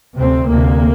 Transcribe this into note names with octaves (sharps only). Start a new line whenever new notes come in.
D2 C3 C4
D2 C3 A#3